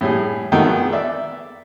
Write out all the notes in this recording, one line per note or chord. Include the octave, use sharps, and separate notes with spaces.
A2 G3 G#4
B2 D3 D#3 F3 G#3 A3
B3 G#4
D5 E5